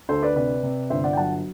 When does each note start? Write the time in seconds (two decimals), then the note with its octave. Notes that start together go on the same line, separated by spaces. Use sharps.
0.09 D2 A4 C5
0.22 B4 D5
0.36 C3 B4 D5
0.63 C3
0.90 G1 C5 E5
1.04 D5 F#5
1.13 G5
1.17 F#3 F#5 A5